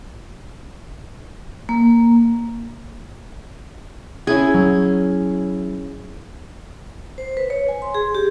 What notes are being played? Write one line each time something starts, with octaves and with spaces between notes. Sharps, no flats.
A#3
C#4 E4 G#4
F#3
C5
B4
C#5
G#5
C6
G#4
G4